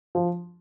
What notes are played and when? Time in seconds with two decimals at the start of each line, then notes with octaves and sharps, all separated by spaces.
0.15 F3